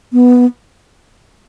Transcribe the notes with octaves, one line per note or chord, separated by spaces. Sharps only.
B3